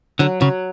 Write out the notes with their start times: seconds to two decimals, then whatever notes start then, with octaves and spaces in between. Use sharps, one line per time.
0.19 D3 F#3
0.41 C#3 F#3